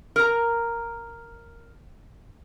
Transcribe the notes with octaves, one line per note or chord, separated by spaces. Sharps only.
A#4 A#5